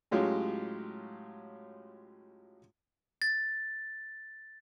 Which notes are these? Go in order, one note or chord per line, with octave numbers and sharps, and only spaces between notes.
A2 F#3 G#3 C#4 F4 G4
A6